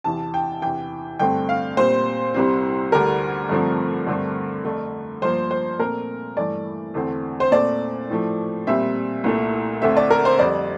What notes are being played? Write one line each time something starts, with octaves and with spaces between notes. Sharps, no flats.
E2 C3 E3 A5
G5
E2 C3 E3 G5
G2 D3 A3 C4 G5
F5
A#2 G3 C4 C5
C2 C3 G3 C4
D2 D3 G3 A#4
G2 D3 F3 A3 C4
G2 D3 A3 C4
F2 D3 A3
G2 F3 A#3 C5
C5
A#2 A3 C4 A#4
G2 E3 A3 D5
E2 D3 A3 C4
C5
A#2 A3 C4 D5
A2 F3 A3
A#2 G3 C4 E5
C2 A#2 A3
D2 D3 A3 C4 E5
D5
A#4
C5
F2 D3 G3 D5